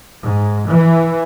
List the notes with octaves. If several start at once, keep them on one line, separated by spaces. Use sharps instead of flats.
G#2
E3